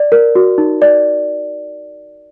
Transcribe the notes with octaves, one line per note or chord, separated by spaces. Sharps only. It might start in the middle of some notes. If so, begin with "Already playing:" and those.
Already playing: D5
A#4
F#4
D#4
D5